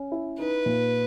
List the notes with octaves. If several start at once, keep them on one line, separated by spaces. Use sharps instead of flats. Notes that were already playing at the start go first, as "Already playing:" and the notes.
Already playing: C#4
E4
D#4 B4
A#2